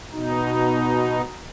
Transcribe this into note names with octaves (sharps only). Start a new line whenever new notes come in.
B2 D#4